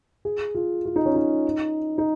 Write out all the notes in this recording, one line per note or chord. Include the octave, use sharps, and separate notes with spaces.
G#4
F4
F4
D#4
C#4
D#4
D#4